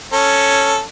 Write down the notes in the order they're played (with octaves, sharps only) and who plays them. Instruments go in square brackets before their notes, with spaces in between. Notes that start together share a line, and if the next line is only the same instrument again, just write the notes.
[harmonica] C#4 A4